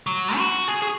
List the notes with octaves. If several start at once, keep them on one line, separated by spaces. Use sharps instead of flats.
F#3
F#4
G#4
G#4